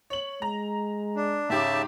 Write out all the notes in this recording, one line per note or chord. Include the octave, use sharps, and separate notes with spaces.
C#5 F#7
G#3 A#5
D4
G#2 C#3 G4 E5 A5 D6